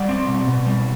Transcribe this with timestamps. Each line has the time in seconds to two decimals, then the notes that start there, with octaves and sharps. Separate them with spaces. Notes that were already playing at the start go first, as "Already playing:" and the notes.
Already playing: G3 D5 F#5
0.09 C4
0.28 B2
0.48 B2
0.66 G3